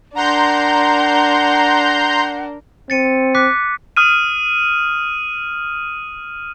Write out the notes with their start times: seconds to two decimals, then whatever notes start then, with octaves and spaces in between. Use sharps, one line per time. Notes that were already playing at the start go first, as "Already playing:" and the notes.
0.15 D4 A#4 F#5 A#5 C6 G6
2.90 C4 A6 C#7 D#7
3.35 D6 F#6 B6
3.97 D#6 F6 D#7